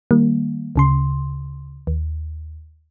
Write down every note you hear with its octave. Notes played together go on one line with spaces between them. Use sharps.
D#3 G3 A#3
D2 C#3 C6
D#2